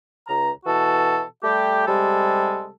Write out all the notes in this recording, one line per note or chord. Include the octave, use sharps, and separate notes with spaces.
C#2 A#5
B2 E3 F#4 A4
G3 A3 G4
C3 G3 G#3 A4